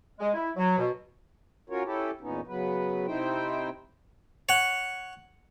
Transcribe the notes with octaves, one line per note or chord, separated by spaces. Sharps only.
G#3
E4
F#3
B2
C#4 F4 F#4 A#4 C#5
C#4 E4 G4 A4
E2 A#2 B3 C#4 D#4
C#3 F#3 B3 B4
C3 C4 D#4 E4 C5 G5
C#5 F#5